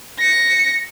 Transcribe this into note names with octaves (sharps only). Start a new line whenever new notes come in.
A#6 C#7